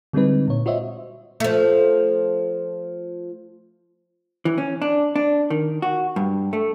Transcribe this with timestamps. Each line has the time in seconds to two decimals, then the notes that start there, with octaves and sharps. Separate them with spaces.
0.13 D3 G3 G#3 C4 D#4 B4
0.48 A#2 C#5
0.66 F4 F#4 C5 C#5 D#5 E5
1.40 F3 A3
4.45 E3
4.58 C#4
4.82 D4
5.16 D4
5.50 D#3
5.82 F#4
6.16 G2
6.53 A3